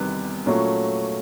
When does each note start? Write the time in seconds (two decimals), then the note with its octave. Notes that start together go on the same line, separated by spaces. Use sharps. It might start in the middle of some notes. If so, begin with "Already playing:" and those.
Already playing: E2 C3 D#3 G3 B3 F#6
0.46 A#2 F#3 A3 C#4